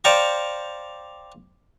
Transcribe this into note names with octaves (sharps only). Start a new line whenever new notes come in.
C5 D5 F5 G5 A#5 C#6